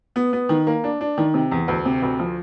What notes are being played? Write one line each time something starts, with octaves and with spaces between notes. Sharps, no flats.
B3
B3
D#3
A#3
D4
D4
D#3
C3
E2
D2
C3
D2
F3